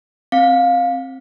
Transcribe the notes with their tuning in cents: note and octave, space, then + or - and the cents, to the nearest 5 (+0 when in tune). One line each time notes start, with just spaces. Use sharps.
C4 +15 F5 +15